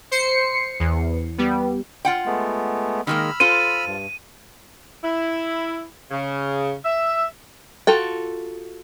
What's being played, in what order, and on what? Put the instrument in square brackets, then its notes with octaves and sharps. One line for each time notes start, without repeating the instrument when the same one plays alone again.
[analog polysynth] C5 C7 C#7
E2
G3 B3
[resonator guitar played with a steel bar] F4 F#5 G5
[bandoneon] G#3 A3 B3
[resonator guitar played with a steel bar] D#3 G#3 A#3 [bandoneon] B5 E6 F6
[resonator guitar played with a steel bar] F4 A4 C5 [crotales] D#7
[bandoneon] G2
[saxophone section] E4
C#3
E5
[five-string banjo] F4 F#4 A4 G5